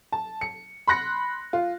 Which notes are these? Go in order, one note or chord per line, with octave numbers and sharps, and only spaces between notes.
A5
C#7
B5 C6 F#6 A#6 C#7
F4